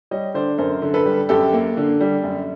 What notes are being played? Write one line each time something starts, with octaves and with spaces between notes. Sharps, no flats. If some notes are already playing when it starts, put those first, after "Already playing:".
G3 C#5 D#5
D3 C5 D5
F#2 A#4 C5
D3
A4 B4
G3
F#2 G4 A4
A#3
D3
G3
F#2